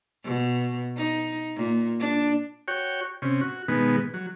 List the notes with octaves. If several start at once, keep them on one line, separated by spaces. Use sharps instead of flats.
B2
D#4
A#2
D4
F#4 C#5 G5
C3 C#4
F#4
B2 D#3 G#3 B3
F#3